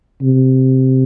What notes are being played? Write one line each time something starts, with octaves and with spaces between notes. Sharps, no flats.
C3